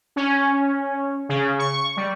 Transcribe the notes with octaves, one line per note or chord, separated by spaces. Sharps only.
C#4
C#3
C#6
G3